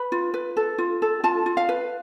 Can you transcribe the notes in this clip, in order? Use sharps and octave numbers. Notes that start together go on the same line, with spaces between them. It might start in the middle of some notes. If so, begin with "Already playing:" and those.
Already playing: B4 B5
F4
B4
A4
F4
A4
F4 A5
F4
F5
B4